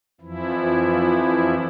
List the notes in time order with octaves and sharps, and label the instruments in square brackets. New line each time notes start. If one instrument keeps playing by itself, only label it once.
[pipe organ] F2 E3 F3 E4